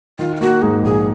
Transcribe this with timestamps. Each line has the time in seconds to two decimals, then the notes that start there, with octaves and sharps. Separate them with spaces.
0.19 D#3 F4
0.36 F4
0.41 A#3 F#4
0.62 G#2 G#4
0.83 A#1 G#4